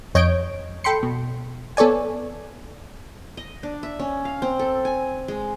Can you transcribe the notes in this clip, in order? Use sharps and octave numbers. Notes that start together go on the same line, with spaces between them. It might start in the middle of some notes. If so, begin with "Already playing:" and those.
F2 C#5 D#5 G6 G#6 D7
A4 G5 B5 C6 C#7
B2
B3 A4 C#5 D5 G#5
D#5
D4
E5
C#4
F5
C4
A4
G#5
G#3